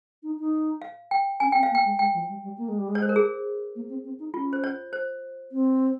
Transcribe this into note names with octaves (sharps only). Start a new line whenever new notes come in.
D#4
D#4
F5
G5
C#4 G#5
C4 G5
F5
A#3
G5
G#3
G#3 G5
F3
G3
G3
A#3
G#3
G3
G#3
C#5
C5
A#4
G#4
A#3
C4
C4
D#4
C#4 F4
C5
C#5
C5
C4